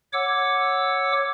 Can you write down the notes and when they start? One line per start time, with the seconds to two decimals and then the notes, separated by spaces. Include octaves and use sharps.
0.13 C#5 F#5 D6 E6